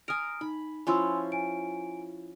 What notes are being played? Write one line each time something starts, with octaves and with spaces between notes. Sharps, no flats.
G#5 A#5 D#6 F6 D7
D#4 B5
F3 C#4 E4 G#5 C6 E6
G#5 D7